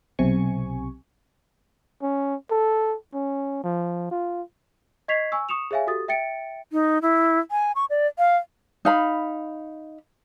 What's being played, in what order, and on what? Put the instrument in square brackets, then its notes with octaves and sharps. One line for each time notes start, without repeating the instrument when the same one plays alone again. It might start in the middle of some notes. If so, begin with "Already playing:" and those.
[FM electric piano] B1 C3 G#5 C#6
[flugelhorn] C#4
A4
C#4
F3
F4
[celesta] D#5 C#6 G#6 B6 C7 F7
G#5 C#6 E6
C#6 D#6 C#7 E7 F7
G#4 C#5 E5 F5 G#5
F#4 G4 A4 D#6 A6
E5 G5 A6 C#7 D7
[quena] D#4
E4
G#5
C#6
D5
F5
[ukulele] D#4 F5 B5